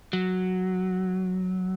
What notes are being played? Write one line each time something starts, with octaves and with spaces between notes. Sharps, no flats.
F#3